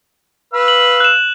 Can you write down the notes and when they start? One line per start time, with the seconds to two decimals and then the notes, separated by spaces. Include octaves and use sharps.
0.54 B4 F5 E6
0.68 F#7
1.00 F#6 E7